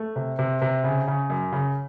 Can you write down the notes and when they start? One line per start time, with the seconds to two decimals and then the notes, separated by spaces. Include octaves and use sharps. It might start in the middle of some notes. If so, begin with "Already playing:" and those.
Already playing: A3
0.16 C3
0.39 C3
0.62 C3
0.84 C#3
1.08 C#3
1.30 F#2
1.52 C#3